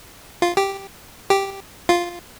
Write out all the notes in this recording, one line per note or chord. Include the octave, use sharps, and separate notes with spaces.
F4
G4
G4
F4